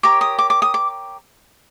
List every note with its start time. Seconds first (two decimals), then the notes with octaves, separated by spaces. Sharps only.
0.03 G4 A#4 C#5 D6
0.21 D#6
0.38 D6
0.50 D6
0.62 D#6
0.74 D6